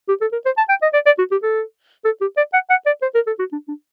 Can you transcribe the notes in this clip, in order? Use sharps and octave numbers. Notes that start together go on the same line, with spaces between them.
G4
A4
A#4
C5
A5
G5
D#5
D5
D5
F#4
G4
A4
A4
G4
D5
F#5
F#5
D5
C5
A#4
A4
F#4
D4
D4